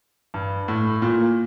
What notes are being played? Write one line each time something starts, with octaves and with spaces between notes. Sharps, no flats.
G2
A2
A#2